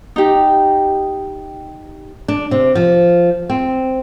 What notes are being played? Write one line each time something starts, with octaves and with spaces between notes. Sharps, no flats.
D#4 G4
D4
C3
F3
C4